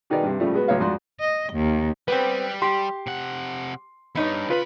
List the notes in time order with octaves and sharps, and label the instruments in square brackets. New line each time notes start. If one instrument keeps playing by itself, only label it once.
[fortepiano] B2 D#3 D#4 G#4 B4 D5
G2 C3
A2 C#3 F3 G3 A3
G#3 B3 F#4 B4
C#2 A2 F#3 C#5 F5
F2 G#2 D4 F#4 C6
[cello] D#5
D#2
[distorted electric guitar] G3 [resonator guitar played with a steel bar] B3 C4 [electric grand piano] B4
[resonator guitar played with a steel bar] G4 [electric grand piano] C6
[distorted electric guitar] C3 F#5
[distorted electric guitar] E2 G2 [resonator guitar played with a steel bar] B3 D#4 C#5
[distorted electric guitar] C#3 B5 [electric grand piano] F4 B4